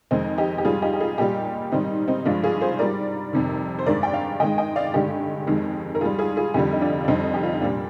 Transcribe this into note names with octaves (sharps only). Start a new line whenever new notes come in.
F2 D#3 G#3 C4 D#4
D#4 G4
G4
G#2 G3 F4 G#4
D#4 G4
G4
F4 G#4
A#2 G3 D#4 G4
G#2 D#3 G3 C4 D#4
C4 D#4
G2 F3 G#3 D4 F4
F4 G#4
G#4 C5
G#2 G3 A#4 D5
F2 C3 D#3
C5
G2 D#3 G#3 A#4 D5
G5
D5 F5
G#2 D#3 G#3 D#5 G5
D#5 G5
D5 F5
G2 D3 G#3 D#4 G4
F2 D#3 G#3
A#4
G#2 G3 F4 G#4
F4 G#4
F4 G#4
F2 D3 G3 D#4 G4
D#4
D4 F4
D4
F2 D3 G3 C4 D#4
G4
F4
D#4
A#2 G3 D4